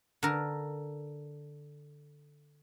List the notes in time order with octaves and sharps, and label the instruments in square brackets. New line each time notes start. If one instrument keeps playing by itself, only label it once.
[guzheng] D3 A#4